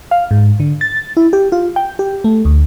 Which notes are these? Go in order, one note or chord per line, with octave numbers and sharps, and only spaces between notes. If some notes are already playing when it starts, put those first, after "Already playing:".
F5
G#2
D3
A6
E4
G4
F4
G5
G4
A3
D2